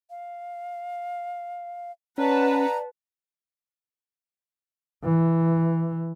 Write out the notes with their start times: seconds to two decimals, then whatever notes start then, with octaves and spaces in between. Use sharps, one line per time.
0.10 F5
2.18 C#4 B4 D5 F#5 A5 A#5
5.04 E3